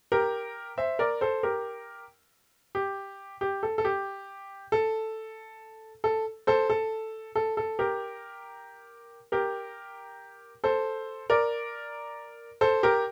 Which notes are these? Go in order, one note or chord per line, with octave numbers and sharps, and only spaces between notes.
G4 A#4
C5 E5
A#4 D5
A4 C5
G4 A#4
G4
G4
A4
A4
G4
A4
A4
A4 C5
A4
A4
A4
G4 A#4
G4 A#4
A4 C5
A#4 D5
A4 C5
G4 A#4